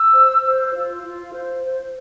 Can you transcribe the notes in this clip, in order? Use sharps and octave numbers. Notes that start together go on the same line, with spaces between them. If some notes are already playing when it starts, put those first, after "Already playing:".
Already playing: E6
C5
C5
F4
F4
C5
C5